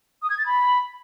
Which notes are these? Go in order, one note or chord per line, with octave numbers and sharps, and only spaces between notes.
D#6
G#6
A6
B5